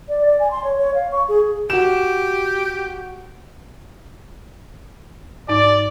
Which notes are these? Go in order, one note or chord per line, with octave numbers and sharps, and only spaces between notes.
D5
D5
G#5
C6
C#5
C#5
F5
C#6
G#4
F#4 G4 E7
G#2 D#4 D5 D6